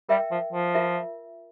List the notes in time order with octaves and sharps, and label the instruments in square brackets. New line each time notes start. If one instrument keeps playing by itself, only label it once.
[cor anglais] G3 [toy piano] A#4 E5 G5
[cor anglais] F3
F3
[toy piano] F4 A#4 E5